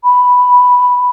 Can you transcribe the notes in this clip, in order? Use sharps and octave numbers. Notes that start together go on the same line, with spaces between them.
B5